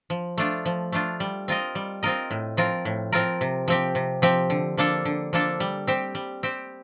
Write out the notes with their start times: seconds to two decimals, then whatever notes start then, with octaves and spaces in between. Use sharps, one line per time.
0.10 F3
0.38 A3 D4 F4
0.65 F3
0.92 A3 D4 F4
1.20 G3
1.48 C4 F4 A#4 D#5
1.75 G3
2.03 C4 F4 A#4 D#5
2.30 A2
2.57 F3 C4 F4 A#4
2.85 A2
3.12 F3 C4 F4 A#4
3.41 C3
3.68 F3 C4 G4
3.95 C3
4.22 F3 C4 G4
4.50 D3
4.77 F3 A#3 D4 A4
5.05 D3
5.33 F3 A#3 D4 A4
5.60 G3
5.87 C4 G4 C5
6.15 G3
6.43 C4 G4 C5